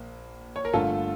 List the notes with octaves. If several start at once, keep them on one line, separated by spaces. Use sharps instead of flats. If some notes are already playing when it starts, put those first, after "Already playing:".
Already playing: A#1 A#3
C#5
A#4
G1 G2 D3 A3 F4 A4